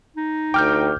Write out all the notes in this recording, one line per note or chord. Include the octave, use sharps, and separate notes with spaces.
D#4
D2 G5 D6 F6 G6